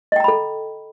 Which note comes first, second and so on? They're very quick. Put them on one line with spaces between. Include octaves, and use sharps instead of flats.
D#5 G5 A#5 B5 A4